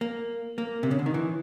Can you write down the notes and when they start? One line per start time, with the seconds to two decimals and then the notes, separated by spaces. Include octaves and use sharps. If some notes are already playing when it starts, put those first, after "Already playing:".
0.01 A#3
0.58 A#3
0.83 C3
0.91 C#3
0.99 D3
1.06 D#3
1.14 E3